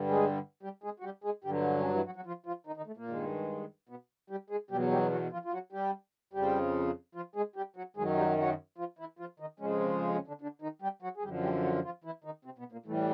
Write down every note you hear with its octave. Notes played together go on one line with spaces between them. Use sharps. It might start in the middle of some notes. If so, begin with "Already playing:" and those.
Already playing: G2 D3 G3
G#3 G#4
G3 G4
G#3 G#4
F#4
G3 G4
G#3 G#4
G2 D3 F#3 G3 G4
C#4
D3 D4
E3 E4
F#3 F#4
F#3 F#4
F3 F4
F3 F4
D#3 D#4
D#3 D#4
A3
A#2 A#3
G2 D#3 G#3
B2 B3
G3 G4
G#3 G#4
E2 B2 F#3 G3 G4
G3 G4
F#3 F#4
F3 F4
F4
F#3 F#4
G3 G4
F2 C#3 F3 G3 G4
F3 F4
G#3 G#4
G3 G4
F#3 F#4
F#2 D#3 F#3 G#3 G#4
G3 G4
F#3 F#4
F3 F4
E3 E4
F3 F4
D#3 D#4
F2 C#3 F3 G#3 C#4
C3 C4
C#3 C#4
D3 D4
D3 D4
D#3 D#4
G3 G4
F#3 F#4
G#4
F#2 D3 F3 G3 G4
G3 G4
F#3 F#4
F3 F4
E3 E4
D#3 D#4
C3 C4
B2 B3
A#2 A#3
A2 E3 G3 A3